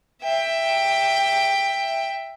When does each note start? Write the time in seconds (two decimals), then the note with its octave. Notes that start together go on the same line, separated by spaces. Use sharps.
0.22 E5 G5